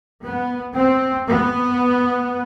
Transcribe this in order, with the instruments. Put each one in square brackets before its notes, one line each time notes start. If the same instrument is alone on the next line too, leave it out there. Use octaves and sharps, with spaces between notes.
[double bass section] B3
C4
B3